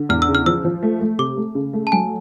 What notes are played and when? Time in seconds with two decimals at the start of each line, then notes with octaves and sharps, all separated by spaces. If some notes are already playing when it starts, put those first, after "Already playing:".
Already playing: D3
0.09 E2 F6
0.22 E6
0.29 C#3
0.35 F6
0.46 F3 E6
0.65 F3
0.83 A3
1.01 A3
1.19 C3 D6
1.37 A3
1.55 C#3
1.73 A3
1.87 A5
1.92 F#3 G#5